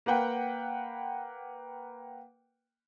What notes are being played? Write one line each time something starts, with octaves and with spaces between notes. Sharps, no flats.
A#3 B4 F#5 G5